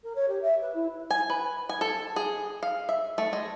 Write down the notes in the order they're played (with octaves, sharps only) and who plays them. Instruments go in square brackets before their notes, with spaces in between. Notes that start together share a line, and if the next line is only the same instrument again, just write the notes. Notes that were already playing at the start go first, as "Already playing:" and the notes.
[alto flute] A#4
C#5
G4
E5
B4
E4
[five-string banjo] G#5
B4
G#5
A4
G#4
F5
E5
A3
G#3